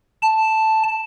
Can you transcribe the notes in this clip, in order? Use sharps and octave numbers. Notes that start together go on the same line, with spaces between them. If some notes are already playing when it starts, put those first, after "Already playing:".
A5